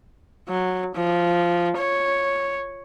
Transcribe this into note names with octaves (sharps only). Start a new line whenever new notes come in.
F#3
F3
C#5